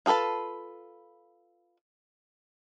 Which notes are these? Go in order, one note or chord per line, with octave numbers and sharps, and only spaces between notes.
F4 G#4 A4 B4 A5